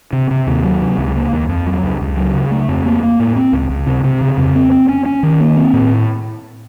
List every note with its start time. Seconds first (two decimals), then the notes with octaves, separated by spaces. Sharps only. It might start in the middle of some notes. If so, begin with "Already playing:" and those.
0.13 C3
0.31 C3
0.47 D#2
0.64 F#3
0.82 C3
0.98 C#2
1.15 A#3
1.33 D#2
1.49 F2
1.66 F#3
1.83 C#2
2.01 C#2
2.17 F#3
2.34 C#3
2.51 A3
2.68 F2
2.86 A#3
3.03 A#3
3.20 A2
3.36 C4
3.53 C#2
3.70 C#2
3.87 C3
4.04 C3
4.21 C#3
4.37 F2
4.56 C4
4.72 C4
4.89 C#4
5.06 C#4
5.23 D#3
5.40 A#3
5.57 C4
5.73 A2